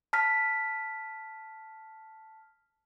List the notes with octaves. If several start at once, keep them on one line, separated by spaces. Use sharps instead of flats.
A5 F6 B6